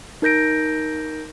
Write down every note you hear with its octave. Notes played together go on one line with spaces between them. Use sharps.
D#4 A#4 G6 A#6 D7